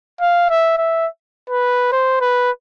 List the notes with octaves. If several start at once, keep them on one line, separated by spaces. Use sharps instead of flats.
F5
E5
E5
B4
C5
B4